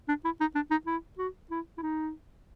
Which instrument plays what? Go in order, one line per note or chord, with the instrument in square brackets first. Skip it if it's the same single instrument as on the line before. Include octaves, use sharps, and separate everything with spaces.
[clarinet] D4
E4
D#4
D4
D#4
E4
F#4
E4
E4
D#4